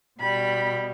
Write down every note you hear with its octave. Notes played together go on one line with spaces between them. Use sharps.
B2 G3 B5